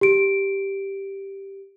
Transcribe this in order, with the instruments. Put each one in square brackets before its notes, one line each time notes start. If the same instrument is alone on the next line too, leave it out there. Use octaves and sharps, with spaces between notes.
[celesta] G4 D7